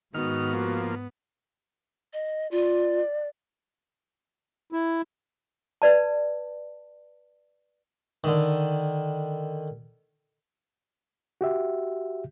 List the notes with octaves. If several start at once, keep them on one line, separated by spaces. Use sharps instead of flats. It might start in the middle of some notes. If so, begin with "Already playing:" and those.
G#2 D#3 B3 F#4 F6
F3 A#3
D#5
F4 D5
E4
B4 D5 A5
D3 D#3
F#4 G4 E5